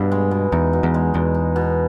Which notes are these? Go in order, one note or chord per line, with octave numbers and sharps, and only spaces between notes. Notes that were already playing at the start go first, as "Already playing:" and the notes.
Already playing: G2 B2
G#3
B2
E2 D#4
B2
E2
G#3
E2 B2
D#4
B2